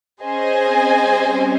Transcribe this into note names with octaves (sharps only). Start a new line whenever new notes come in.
C#4 G#4 C5 D#5 G#5
C4
G3